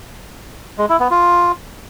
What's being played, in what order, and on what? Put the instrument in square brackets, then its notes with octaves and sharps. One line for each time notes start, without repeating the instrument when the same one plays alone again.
[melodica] G#3
E4
B3
F4